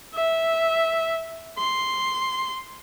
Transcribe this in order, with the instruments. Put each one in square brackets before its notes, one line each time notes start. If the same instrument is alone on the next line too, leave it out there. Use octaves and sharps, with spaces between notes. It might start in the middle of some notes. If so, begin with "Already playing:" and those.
[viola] E5
C6